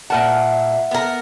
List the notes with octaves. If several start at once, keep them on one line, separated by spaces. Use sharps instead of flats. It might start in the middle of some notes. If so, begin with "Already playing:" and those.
A#2 A#4 E5 F#5 A5
B3 A#4